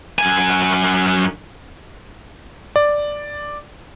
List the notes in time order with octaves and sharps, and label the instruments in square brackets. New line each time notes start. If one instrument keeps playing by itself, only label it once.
[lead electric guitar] F#2 G#5
[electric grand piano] D5